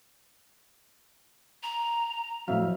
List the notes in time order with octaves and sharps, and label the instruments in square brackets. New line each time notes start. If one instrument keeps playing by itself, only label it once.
[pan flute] A#5
[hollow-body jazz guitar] F2 [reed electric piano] A2 E5 F5 [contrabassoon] F#3